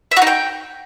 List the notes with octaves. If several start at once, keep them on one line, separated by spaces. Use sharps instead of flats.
E5
F#4
D#4
G5